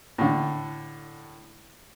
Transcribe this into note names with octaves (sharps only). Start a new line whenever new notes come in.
A2 D3